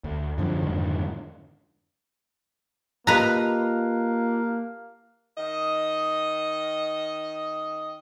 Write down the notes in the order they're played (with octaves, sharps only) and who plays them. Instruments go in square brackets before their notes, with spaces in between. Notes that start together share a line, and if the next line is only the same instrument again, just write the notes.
[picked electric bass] D2
F#2 D3 F3
F2 G#2 D3 D#3
[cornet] A#3 [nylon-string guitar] F4 D#5 [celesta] G4 A5 F#6 [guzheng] B4 A#5
[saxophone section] D#3 D#5